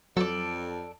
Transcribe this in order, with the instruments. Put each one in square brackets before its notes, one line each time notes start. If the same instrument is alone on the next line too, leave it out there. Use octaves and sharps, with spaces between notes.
[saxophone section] F2 [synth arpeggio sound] F#3 [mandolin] A4 D5